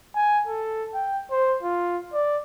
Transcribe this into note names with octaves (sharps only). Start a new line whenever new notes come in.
G#5
A4
G5
C5
F4
D5